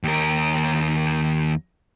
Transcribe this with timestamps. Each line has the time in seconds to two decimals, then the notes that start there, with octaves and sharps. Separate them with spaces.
0.04 D#2 A#4